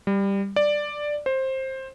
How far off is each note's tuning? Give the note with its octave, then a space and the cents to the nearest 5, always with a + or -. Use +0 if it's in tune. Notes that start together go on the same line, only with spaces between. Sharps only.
G3 +10
D5 +5
C5 +15